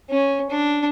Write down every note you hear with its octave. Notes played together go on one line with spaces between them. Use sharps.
C#4
D4